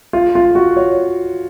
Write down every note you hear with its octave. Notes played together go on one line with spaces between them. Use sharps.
F4
F4
F#4
C#5